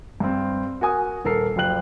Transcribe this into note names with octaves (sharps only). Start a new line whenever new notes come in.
G2 C4
F#4 A#4 G#5 D#6
D#1 A4 A#4 C7
F#1 F3 G3 G5 F#6 F#7